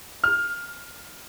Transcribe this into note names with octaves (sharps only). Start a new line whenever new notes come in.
F6